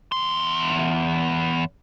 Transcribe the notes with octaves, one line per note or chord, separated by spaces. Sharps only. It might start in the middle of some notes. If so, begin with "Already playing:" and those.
E2 C6